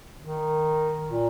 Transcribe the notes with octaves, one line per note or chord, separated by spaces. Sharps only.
D#3
A#2